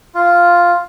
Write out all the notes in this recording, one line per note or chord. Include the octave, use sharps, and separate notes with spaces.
F4